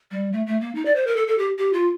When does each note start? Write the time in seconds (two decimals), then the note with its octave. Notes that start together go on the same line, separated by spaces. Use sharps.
0.11 G3
0.33 A3
0.46 A3
0.61 A#3
0.75 D#4
0.85 D5
0.95 C5
1.07 A#4
1.16 A4
1.27 A4
1.38 G4
1.58 G4
1.73 F4